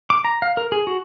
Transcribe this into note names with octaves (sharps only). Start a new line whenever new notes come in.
D6
A#5
F5
A#4
G#4
F#4